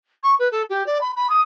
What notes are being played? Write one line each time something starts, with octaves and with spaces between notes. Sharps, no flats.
C#6
B4
A4
G4
D5
B5
B5
D#6